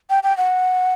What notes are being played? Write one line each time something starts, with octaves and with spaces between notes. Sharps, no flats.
G5
G5
F#5